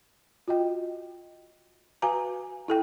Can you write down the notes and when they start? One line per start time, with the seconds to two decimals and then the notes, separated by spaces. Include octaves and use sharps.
0.48 F4 F#4 D#5 G5
2.02 F#4 B4 F5 G#5 A#5 D6
2.68 E4 A4 G5